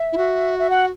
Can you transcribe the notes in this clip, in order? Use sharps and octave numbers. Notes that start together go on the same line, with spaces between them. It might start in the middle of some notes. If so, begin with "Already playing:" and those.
Already playing: E5
E4
F#4
E5
F#5